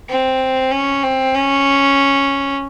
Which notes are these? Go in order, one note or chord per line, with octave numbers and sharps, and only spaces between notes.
C4
C#4
C4
C#4